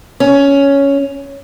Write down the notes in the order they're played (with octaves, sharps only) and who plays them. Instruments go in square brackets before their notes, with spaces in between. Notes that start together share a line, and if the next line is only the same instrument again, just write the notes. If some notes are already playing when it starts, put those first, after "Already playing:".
[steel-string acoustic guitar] C#4